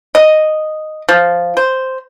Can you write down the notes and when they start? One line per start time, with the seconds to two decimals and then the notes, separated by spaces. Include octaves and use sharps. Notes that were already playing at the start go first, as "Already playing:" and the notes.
0.15 D#5
1.09 F3
1.57 C5